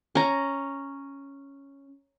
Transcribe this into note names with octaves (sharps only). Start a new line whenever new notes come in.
C#4 A#5